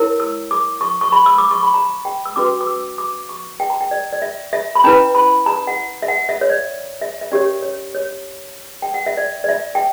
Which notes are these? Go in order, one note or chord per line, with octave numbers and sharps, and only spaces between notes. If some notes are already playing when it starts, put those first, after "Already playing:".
Already playing: E4 A#4 C#5
E6
D6
C#6
C#6
B5
E6
D6
C#6
B5
A#5
G5
E6
C#4 F#4 B4 D6
D6
E6
D6
C#6
G5
A#5
G5
D5
D5
E5
E5
B5
C#4 E4 B4 A#5
B5
A#5
F#5
E5
F#5
E5
C#5
D5
E5
E5
C#4 G4 A#4 C#5 D5
C#5
C#5
G5
F#5
E5
D5
D5
E5
G5